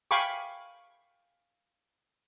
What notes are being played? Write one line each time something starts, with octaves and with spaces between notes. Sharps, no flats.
F5 G5 G#5 B5 C#6 D6